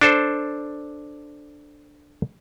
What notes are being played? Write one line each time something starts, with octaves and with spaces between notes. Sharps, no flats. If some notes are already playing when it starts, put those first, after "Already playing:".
D4 A4 C5